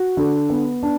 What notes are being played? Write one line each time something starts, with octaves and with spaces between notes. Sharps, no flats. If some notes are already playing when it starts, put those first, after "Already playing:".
Already playing: F#4
D3
B3
D4